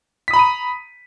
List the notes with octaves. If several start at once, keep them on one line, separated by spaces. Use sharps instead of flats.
A#5 B5 D#6 B6 D#7